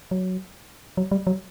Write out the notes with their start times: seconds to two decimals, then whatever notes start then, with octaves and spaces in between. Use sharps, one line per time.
0.11 F#3
0.97 F#3
1.12 G3
1.27 F#3